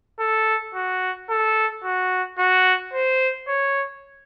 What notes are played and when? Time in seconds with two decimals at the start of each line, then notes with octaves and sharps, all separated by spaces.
0.20 A4
0.75 F#4
1.30 A4
1.84 F#4
2.39 F#4
2.94 C5
3.48 C#5